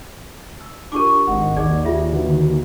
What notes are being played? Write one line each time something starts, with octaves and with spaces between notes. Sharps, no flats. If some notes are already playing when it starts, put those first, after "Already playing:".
E6
D4 F4 G4 A#4 C#6 D6
G#1 D#5 F#5
D#2 G#4 D5
F4 G4 G#4 E5
D3 F#4 B4